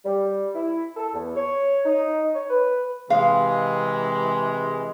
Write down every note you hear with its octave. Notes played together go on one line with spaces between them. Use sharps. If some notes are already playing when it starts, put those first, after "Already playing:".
G3
E4
A4
E2
C#5
D#4
C#5
B4
C3 E3 G#3 F5